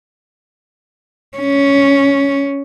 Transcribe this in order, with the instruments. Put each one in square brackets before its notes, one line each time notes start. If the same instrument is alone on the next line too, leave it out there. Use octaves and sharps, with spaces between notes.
[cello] C#4